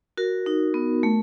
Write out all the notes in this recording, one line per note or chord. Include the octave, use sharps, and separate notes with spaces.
F#4 A#4
D#4
B3
A3